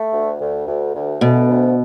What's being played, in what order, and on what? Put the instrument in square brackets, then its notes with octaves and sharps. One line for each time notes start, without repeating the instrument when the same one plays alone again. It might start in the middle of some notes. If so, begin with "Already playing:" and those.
Already playing: [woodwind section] A3
D2
D2
D2
D2
[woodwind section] D2 [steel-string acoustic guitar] B2
[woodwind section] D2